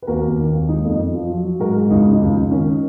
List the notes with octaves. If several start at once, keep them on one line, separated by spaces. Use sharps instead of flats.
B4
D#2 F#4 A#4
D#2
D#3
D#2
G#3 D#4
F2
F2
F3
F#3
F#3
G#2 F#4 A#4
G#2
C#2 D#4 F#4
C#3
D#4
C#2
C#2
D#3 C#4